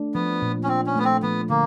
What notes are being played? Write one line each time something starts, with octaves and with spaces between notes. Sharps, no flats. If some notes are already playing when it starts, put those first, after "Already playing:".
Already playing: A3 D4
F3 B3
A#2
C#4
C4 D4
C#4
A3 B3
C4
F3 B3
D3 A#3